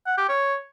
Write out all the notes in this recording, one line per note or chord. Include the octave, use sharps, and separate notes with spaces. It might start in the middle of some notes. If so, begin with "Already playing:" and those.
F#5
G4
C#5